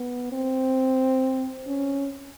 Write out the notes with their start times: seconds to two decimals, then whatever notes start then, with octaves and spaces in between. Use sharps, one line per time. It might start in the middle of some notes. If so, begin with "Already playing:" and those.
Already playing: B3
0.33 C4
1.67 C#4